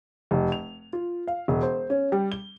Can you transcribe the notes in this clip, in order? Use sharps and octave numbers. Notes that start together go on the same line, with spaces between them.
F1
F7
F4
F5
E1
C5
C#4
G3
G7